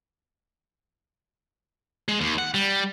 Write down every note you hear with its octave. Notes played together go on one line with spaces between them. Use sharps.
G#3
D#2
F#5
G3